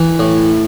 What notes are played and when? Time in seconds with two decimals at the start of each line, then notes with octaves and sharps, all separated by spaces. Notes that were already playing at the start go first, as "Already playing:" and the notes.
Already playing: E3
0.19 A2